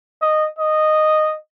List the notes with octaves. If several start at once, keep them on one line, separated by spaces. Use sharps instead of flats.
D#5
D#5